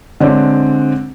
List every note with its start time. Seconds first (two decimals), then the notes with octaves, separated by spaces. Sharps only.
0.20 D3 G#3 C4 D4 C#5 D5